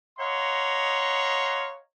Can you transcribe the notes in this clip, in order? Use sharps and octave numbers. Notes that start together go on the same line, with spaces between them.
C#5 D#5 F5 F#5 A#5 C6